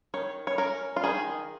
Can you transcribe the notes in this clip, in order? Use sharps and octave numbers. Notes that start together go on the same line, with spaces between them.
D#3 C#5
C#5
C#4 A#4
F4
D#3 G#4